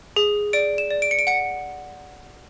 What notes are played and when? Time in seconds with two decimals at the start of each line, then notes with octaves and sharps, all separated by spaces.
0.16 G#4
0.53 D5 D7
0.78 E7
0.91 D5
1.02 D7
1.11 C#7
1.19 D7
1.27 F#5 C#7